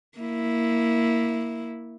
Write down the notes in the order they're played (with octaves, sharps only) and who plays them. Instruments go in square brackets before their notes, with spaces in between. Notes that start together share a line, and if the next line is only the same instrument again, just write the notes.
[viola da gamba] A#3 E4